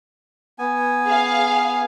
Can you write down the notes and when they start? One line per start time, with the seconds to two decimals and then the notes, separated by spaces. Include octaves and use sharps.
0.58 B3 G#5
1.06 G#4 F5